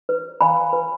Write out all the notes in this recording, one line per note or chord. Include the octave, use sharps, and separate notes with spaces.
B4
F5 G#5 B5
B4